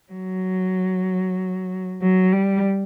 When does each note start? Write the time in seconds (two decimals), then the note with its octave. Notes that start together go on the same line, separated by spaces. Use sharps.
0.13 F#3
2.02 F#3
2.33 G3